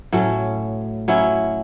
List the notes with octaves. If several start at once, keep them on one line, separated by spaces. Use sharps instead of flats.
A2 F#3 C#4
F#3 C#4 E4